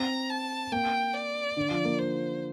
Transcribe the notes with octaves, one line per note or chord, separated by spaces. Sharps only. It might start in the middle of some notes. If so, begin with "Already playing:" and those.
Already playing: C4 A#5
A5
A#3 G5
D5
D3
F3
A#3
C5